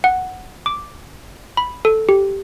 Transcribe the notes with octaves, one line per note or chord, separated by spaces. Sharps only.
F#5
D6
B5
A4
G4